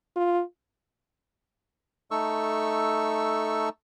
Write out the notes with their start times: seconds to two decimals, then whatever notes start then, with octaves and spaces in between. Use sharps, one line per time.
0.16 F4
2.11 A3 D#4 A4 C#6 E6